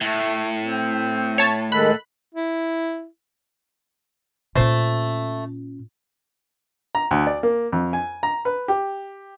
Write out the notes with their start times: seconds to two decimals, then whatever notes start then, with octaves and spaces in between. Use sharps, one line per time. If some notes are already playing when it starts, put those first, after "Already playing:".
0.01 A2 A3
0.60 C4
1.38 C#5 A5
1.72 D#3 G#3 A4 B5 F#6
2.35 E4
4.55 A#2 A3 C#4 C5
6.95 A#5
7.11 D2
7.27 D5
7.43 A#3
7.73 F2
7.93 G#5
8.23 A#5
8.45 B4
8.68 G4